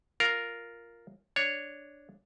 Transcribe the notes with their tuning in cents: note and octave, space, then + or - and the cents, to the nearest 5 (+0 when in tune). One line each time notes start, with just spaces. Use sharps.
F4 +0 A#4 +0 F5 +0
D4 +0 C#5 +0